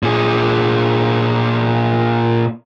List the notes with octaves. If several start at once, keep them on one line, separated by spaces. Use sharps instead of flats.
A#2 G#4